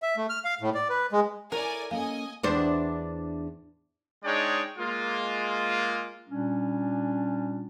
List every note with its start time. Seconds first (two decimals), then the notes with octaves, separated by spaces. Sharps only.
0.02 E5
0.17 A3
0.29 F6
0.45 F5
0.61 A2
0.75 D5
0.89 B4
1.12 G#3
1.52 E4 A4 A#4 C#5 D5 G#5
1.91 A#3 C#4 A4 D#5 F5 G#5
2.43 E2 D4 C5
4.24 G#3 D4 D#4 C#5 D5 G5
4.77 G#3 A#3 F4
6.28 A#2 G3 C#4 D4